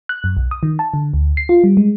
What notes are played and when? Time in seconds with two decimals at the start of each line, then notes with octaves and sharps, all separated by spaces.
0.09 F#6
0.24 F#2
0.37 B1
0.51 D#6
0.63 D#3
0.79 A5
0.94 D3
1.14 D2
1.37 C7
1.49 F4
1.64 G3
1.77 G#3